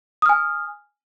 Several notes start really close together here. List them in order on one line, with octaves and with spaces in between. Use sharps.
D#6 F6 G#5